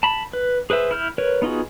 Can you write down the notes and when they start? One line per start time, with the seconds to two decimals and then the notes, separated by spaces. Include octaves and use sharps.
0.03 A5 B5
0.33 B4
0.70 G#4 B4 C5 E5
0.91 E4 F6 G6
1.18 A#4 B4 C#5
1.42 B3 D#4 F4 F#4 G#4